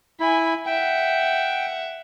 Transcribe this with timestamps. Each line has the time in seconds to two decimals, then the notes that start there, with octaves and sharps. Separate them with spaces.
0.20 E4 G#5 B5
0.66 E5 F#5 G5